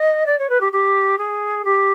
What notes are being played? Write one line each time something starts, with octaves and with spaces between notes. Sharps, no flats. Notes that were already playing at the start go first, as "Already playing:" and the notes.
Already playing: D#5
D5
C#5
B4
G4
G4
G#4
G4